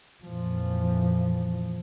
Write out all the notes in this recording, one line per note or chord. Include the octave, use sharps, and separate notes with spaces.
F2 A#2 E3 F3